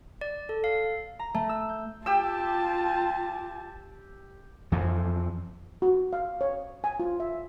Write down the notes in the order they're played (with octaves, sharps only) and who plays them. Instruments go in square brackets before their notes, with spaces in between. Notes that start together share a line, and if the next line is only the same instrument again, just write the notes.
[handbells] D5
A4
F5
[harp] A#5
A3
E6
G6
[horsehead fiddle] F4 A5 [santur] G4 G5 E6
[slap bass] F2 E3 F3
[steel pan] F#4
F5
C#5
G#5
F4
E5